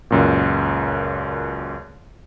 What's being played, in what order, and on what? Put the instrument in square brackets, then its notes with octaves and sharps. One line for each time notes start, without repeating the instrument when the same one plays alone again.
[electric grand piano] C#2 F#2 A#2